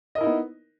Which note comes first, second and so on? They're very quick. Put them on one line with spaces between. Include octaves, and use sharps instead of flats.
D#5 A#4 E4 D#4 B3